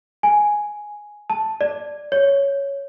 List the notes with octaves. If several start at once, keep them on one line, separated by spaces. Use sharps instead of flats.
G#5
A5
D5
C#5